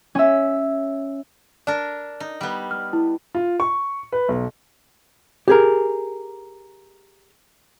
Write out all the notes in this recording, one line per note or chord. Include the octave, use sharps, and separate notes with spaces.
C#4 E5
D4 A#4 D5
D#4
G3 B3
F6
E4
F4
C#6
B4
B1
G4 G#4 A#4